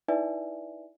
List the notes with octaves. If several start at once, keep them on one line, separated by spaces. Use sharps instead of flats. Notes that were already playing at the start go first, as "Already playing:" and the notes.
D#4 E4 B4 D5 E5 G#5